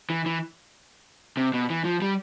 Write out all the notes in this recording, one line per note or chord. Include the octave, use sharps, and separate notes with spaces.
E3
E3
C3
B2
E3
F3
G3